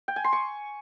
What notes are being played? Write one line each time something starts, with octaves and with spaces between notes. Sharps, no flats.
G5
G#5
C6
C#6